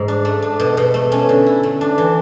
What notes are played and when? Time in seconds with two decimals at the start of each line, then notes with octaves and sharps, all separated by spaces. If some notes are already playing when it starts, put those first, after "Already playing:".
Already playing: G#2
0.08 D4
0.25 A3
0.42 D4
0.60 B2
0.77 B2
0.94 A3
1.12 C#4
1.29 D3
1.46 E4
1.63 A3
1.81 D4
1.98 E3